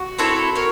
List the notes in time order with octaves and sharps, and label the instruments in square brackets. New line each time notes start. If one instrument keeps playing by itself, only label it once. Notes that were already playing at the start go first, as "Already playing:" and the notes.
Already playing: [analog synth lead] F#4
[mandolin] C4 E4 A4 C#5
A#4 C#5